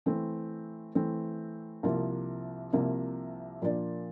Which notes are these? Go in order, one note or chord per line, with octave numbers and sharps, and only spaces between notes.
E3 A3 C4
E3 A3 C4
C2 C3 F3 A#3
C2 C3 F3 A#3
A#2 F3 A#3 D4